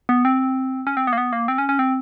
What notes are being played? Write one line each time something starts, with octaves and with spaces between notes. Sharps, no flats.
B3
C4
C#4
C4
B3
A#3
B3
A#3
C4
C#4
C#4
C4